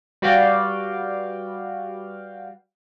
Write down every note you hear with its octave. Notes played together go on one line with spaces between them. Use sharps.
G3 F#4 B4 D5 F5 G5